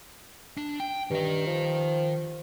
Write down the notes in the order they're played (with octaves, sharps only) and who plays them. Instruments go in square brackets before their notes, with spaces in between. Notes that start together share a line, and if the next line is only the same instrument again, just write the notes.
[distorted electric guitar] D4
G5
[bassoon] G2 [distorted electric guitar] D#3 D#5
[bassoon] F3